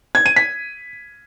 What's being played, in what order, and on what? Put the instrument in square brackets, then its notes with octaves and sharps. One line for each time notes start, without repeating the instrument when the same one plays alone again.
[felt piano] G#6
D#7
B6